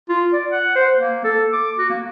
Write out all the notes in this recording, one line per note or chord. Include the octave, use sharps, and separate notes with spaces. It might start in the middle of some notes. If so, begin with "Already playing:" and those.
F4
D5
F#5
C5
A#3
A4
D6
F#4
A#3